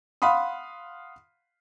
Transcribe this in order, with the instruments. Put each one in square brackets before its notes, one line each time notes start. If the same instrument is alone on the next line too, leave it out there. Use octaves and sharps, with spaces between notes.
[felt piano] F5 F#5 B5 C6 D#6